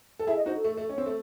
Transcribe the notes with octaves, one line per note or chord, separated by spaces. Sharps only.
A4
E4 G#4 E5
D#5
D#4 F#4 C5
A4
A3
A3
C#4
C4
A3